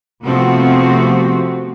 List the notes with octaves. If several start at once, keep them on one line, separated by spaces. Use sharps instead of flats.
C3 F3 A3 B3 C4 F#4